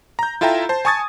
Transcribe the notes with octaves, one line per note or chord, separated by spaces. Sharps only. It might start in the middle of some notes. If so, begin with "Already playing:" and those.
A#5 G6
E4 F4 A4 E5 G5 A#5
C5 A5
G#5 A5 C#6 D#6 G#6 A6